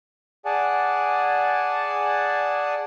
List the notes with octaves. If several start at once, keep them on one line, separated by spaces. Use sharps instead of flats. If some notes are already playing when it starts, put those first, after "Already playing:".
G#4 D5 F#5 G#5 A5